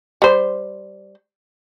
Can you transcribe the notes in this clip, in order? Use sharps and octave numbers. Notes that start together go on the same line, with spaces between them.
G3 C5